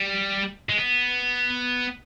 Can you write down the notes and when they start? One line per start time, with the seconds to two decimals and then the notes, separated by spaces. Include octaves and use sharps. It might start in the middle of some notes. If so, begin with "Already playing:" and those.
Already playing: G3
0.69 G#3
0.78 B3